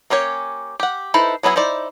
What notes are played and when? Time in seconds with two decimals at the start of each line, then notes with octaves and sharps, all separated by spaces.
0.10 A#3 C#4 G4 C#5
0.80 G4 F#5
1.14 D#4 E4 A4 B4 C5
1.43 F#3 B3 D4 E4 G#4
1.56 D#4 E4 C5 D5